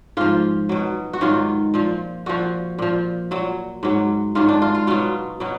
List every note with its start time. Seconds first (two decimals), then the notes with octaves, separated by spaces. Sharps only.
0.17 G#2 F3 F4
0.69 B2 F#3
1.13 F#4
1.21 G#2 D#3 F#3 F4
1.74 A#2 F3
2.26 A#2 F3 F#4
2.79 A#2 F3
3.31 A#2 F#3
3.83 G#2 F#3
4.35 G#2 D#3 F#3 F4
4.49 D4
4.62 F4
4.75 F4
4.87 B2 F#3 F4
5.40 B2 F#3